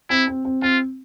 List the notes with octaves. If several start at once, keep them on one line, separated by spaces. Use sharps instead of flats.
C4 E4
C4
C4
C4 F4